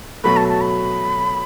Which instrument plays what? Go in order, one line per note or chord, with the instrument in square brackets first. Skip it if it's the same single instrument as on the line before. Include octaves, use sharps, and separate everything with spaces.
[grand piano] B2 F#3 A3 [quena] B5
[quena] A5
A5
B5